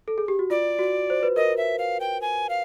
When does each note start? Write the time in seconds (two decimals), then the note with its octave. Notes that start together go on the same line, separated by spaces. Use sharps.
0.08 A4
0.18 G#4
0.28 G4
0.39 F#4
0.50 F4 D5
0.79 F#4
1.10 C5
1.23 B4
1.36 A#4 D#5
1.57 E5
1.79 F5
2.00 G5
2.22 G#5
2.49 F5